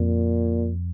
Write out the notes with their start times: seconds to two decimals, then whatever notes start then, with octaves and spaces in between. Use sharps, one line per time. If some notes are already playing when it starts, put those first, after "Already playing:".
Already playing: F2 A#2